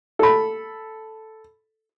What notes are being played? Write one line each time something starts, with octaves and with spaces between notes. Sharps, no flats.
A4 B5